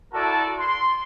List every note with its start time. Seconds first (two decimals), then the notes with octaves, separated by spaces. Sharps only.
0.13 E4 F#4 A4 A#4 D5 A5
0.59 C6